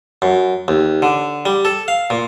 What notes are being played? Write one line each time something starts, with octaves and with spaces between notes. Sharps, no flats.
F#2
D#2
D3
G3
A4
F5
A#2